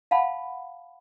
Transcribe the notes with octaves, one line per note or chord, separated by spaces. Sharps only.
F5 F#5 A5 B5